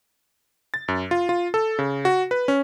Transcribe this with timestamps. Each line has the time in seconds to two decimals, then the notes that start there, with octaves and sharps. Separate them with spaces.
0.74 A6
0.88 F#2
1.11 F4
1.29 F4
1.54 A4
1.79 C#3
2.05 F#4
2.31 B4
2.48 C#4